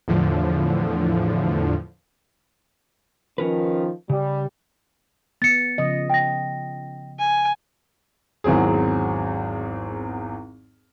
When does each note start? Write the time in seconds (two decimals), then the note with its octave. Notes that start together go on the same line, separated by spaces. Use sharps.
0.08 E2 A2 D3 F3
3.38 D#3 F3 C#4 A#4 B4
4.10 C#3 G3
5.42 B3 A6 C#7
5.78 C#3 F3 D#5
6.10 G5 A#6
7.19 G#5
8.44 G#1 E2 F#3 C4 G#4